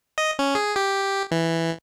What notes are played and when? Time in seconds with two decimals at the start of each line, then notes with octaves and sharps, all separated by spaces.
0.18 D#5
0.39 C#4
0.55 G#4
0.76 G4
1.31 E3